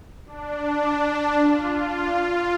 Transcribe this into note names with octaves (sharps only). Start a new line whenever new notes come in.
D4
F4